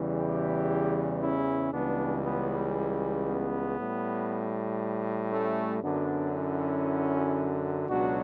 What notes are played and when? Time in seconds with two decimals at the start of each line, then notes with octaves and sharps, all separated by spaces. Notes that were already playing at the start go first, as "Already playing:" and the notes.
Already playing: E2 C#3 E3 G3
0.19 E4 G4
1.21 C#4 E4
1.72 C#2 C#3 E3 G3 B3 D4
2.24 B3
3.27 B3
3.79 A2 G3
5.32 A3 C#4
5.83 F#2 D3 F#3 B3 D4
6.35 C#4 E4
7.89 C#2 B2 F#3 D4 F#4